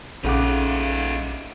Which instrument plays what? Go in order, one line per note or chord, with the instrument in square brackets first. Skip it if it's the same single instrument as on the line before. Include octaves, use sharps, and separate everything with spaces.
[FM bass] A#1 [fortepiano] C#3 [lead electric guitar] D#4 F4 [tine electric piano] A4 F#5 D6